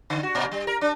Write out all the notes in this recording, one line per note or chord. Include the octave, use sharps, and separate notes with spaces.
D3
F#4
A#2
G3
A#4
D4